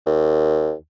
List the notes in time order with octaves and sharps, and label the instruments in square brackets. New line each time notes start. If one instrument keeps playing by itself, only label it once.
[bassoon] D#2